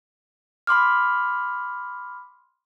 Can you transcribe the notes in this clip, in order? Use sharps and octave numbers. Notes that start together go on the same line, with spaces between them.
B5 C6 D6 F6